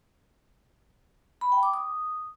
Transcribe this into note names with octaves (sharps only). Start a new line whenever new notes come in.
B5
G5
D6
D#6